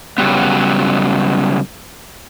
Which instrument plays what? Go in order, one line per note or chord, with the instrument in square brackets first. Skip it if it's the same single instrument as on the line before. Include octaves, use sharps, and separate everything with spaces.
[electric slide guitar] C#3 F#3 G3 B3